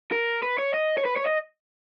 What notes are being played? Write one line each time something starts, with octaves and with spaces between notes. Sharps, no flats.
A#4
B4
C#5
D#5
C#5
B4
C#5
D#5